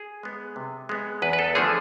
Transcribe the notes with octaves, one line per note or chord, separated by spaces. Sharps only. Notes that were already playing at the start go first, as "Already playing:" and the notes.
Already playing: G#4
G#3 B3
C3
G#3 B3
E2 B4
B4
A4
D3 F3 A3 D4 G#4